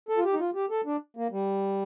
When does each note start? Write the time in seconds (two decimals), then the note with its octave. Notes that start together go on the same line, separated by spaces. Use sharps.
0.09 A4
0.17 F4
0.24 G4
0.33 D#4
0.40 F4
0.55 G4
0.70 A4
0.86 D4
1.17 A#3
1.32 G3